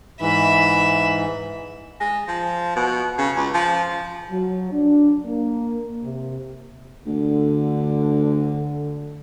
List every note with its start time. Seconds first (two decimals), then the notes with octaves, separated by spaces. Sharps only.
0.21 G#2 E3 E5 B5
2.00 G#3
2.28 F3
2.76 B2
3.18 C#3
3.36 C#2
3.54 F3
4.29 F#3
4.72 D4
5.25 A#3
6.02 C3
7.06 D2 D3